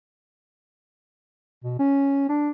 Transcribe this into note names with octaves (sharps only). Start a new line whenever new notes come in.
B2
C#4
D4